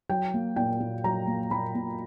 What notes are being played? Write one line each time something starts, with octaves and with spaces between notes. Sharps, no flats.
F#3 G5
A#3
A#2 G5
A#2
F#3 A#5
A#3
A#2 B5
A#2